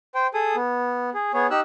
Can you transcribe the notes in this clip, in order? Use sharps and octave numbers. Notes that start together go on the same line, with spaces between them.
C5 G5
G#4 A4 D#6
B3
G#4
B3 G#4 C#5
D#4 G4 E6 F#6